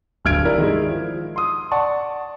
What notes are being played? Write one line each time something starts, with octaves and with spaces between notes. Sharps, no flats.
D1 G2 F6 G#6 D7
E4 G4 A#4 D5
D#3 G#3 E4
F3
C6 D#6
D5 F#5 A5 C#6